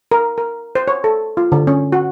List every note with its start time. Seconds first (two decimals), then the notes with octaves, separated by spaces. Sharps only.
0.11 A#4
0.38 A#4
0.75 C5
0.88 C#5
1.04 A4
1.37 F4
1.52 D3
1.67 C#4
1.92 F#4